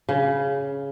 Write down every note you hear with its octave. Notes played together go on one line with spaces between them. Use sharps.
C#3